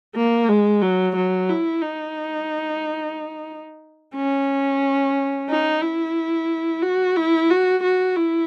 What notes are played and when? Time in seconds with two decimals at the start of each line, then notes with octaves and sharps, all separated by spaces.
0.16 A#3
0.49 G#3
0.82 F#3
1.16 F#3
1.49 E4
1.82 D#4
4.16 C#4
5.49 D#4
5.82 E4
6.82 F#4
7.16 E4
7.50 F#4
7.83 F#4
8.16 E4